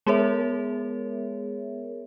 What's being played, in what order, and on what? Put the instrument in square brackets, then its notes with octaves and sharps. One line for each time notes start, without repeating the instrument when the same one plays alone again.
[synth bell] G#3 B3 G#4 A#4 C#5 E5